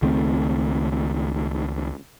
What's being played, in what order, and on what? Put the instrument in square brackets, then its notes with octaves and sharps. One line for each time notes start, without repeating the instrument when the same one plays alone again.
[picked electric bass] C#2 D#3 A3 C4